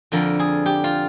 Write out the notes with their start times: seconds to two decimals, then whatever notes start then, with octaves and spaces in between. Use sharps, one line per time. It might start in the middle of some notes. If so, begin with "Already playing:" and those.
0.12 F2 D3 F3 A#4
0.39 G#4
0.66 G4
0.84 F4